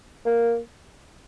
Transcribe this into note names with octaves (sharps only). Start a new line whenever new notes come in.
A#3